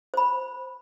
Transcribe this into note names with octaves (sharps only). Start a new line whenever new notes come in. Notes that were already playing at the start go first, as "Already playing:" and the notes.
C5 B5